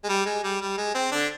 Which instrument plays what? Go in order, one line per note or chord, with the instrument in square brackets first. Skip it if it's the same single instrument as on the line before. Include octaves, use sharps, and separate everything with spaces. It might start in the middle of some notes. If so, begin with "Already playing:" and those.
[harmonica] G#3
G3
G#3
G3
G3
G#3
C4
D3 D4